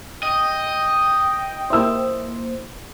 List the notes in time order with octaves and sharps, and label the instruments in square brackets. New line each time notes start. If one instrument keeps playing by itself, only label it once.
[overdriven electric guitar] D#5 [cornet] G5
[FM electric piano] A#3 E4 C5 [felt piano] E5 E6